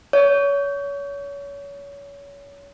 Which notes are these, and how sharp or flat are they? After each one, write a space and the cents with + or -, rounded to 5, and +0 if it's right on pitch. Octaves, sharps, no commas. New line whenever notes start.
C#5 +30